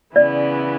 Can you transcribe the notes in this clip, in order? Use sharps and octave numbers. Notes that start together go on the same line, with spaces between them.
C#3 E3 B3 E4 D5